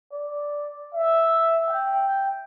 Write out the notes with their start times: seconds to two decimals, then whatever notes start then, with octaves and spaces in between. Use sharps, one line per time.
0.13 D5
0.95 E5
1.70 G5